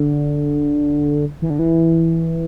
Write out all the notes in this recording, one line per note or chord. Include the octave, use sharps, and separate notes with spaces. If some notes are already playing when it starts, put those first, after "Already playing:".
Already playing: D3
E3
D3
E3